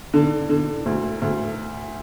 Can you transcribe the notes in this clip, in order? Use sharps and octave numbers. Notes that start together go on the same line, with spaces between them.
D3
D3
D2
D2